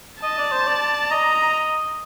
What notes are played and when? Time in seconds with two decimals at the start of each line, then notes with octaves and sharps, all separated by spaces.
0.23 D#5 A5
0.38 D5
0.52 C5
0.67 D5
1.11 D#5 A#5